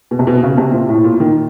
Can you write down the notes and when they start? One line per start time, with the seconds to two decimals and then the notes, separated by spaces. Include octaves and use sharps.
0.11 B2
0.19 C3
0.27 B2
0.43 C#3
0.58 C3
0.73 A#2
0.89 A2
1.04 A#2
1.20 D#3